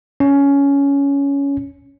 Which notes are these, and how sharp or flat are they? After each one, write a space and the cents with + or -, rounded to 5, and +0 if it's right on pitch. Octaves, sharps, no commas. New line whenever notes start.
C#4 +15